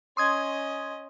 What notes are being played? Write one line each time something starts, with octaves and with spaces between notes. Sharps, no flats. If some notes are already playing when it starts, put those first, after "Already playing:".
C#4 D#5 C6 D#6 G#6